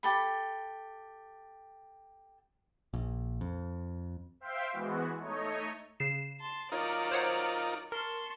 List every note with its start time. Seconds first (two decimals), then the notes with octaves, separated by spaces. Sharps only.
0.03 G4 A4 B5
2.94 A#1
3.41 F2
4.40 C5 E5 F5 G5 C6
4.72 E3 G#3 B3 F#4
5.19 A3 D#4 C#5 D#5
6.00 C#3 C7 E7
6.40 A5 C6
6.72 F#3 D#4 F4 A#4 D5
7.11 C5 C#5 F#5
7.92 A#4 A5 C6 C#6